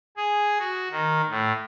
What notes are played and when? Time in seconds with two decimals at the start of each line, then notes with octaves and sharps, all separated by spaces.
0.17 G#4
0.59 F#4
0.91 D#3
1.29 A2